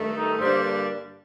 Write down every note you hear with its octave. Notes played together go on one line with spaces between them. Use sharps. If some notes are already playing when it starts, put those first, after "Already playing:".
Already playing: G2 D#3 A3
D#4
G2 D3 G3 A#3 D4 C5